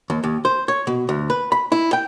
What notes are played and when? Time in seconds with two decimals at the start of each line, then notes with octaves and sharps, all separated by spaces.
0.10 D#2
0.23 D#2
0.45 C5
0.68 C#5
0.87 B2
1.09 D2
1.30 B4
1.52 B5
1.72 E4
1.93 G5